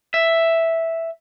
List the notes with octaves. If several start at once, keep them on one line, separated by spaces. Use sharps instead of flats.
E5